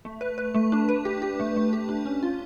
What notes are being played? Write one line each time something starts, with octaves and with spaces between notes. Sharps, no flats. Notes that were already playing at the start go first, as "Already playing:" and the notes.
A3
B4
B4
A3
D4
B4
G4
G4
A3
A3
G4
D4
C#4
F4